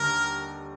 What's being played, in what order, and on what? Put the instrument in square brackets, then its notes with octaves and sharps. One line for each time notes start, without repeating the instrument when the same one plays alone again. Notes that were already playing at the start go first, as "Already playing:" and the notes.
Already playing: [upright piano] D#2 D3 G3 [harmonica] A#4